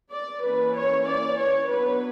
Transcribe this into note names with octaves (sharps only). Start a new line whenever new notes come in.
D5
E3 A#3 C#4 B4
C#5
D5
C#5
F#3 B3 D4 B4